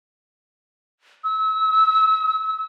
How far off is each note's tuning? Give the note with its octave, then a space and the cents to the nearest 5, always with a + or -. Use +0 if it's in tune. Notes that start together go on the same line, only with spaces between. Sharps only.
E6 -35